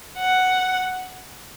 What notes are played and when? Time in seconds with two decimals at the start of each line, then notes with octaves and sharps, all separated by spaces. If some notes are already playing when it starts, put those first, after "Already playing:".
0.18 F#5